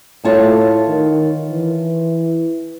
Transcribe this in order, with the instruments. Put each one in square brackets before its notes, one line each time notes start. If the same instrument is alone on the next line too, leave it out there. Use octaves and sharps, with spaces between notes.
[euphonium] A2 [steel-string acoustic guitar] F4 C#5 A5
[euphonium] D#3
E3